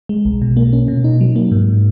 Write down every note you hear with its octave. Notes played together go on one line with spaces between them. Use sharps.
G#3
B1
B2
A#3
C#4
B2
D#4
F#3
A#3
G#2